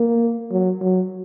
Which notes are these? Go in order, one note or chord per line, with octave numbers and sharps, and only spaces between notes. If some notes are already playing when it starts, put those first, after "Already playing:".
Already playing: A#3
F#3
F#3